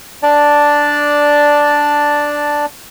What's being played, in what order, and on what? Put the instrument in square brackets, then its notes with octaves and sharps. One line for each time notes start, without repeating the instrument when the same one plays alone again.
[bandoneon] D4 D5 A5